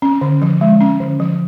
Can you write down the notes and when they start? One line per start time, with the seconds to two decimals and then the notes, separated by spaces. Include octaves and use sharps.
0.02 C#4
0.21 D3
0.42 F3
0.61 G#3
0.81 C#4
1.00 D3
1.20 F3